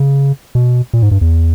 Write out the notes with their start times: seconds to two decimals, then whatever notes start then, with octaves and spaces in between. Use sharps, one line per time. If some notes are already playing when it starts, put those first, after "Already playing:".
Already playing: C#3
0.55 B2
0.93 A#2
1.02 G#2
1.11 G2
1.21 E2